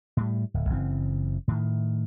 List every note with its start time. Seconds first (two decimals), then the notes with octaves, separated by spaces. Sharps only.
0.17 A2 G3
0.54 D1
0.69 F#1 C#3 E3 C4
1.48 A2 D#3